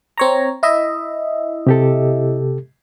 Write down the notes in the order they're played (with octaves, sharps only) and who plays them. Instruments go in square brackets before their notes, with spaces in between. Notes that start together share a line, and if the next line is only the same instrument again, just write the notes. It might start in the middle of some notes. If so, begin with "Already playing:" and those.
[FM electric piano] C4 C#5 A#5
E4 D#5 E5
[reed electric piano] C3 G4 A4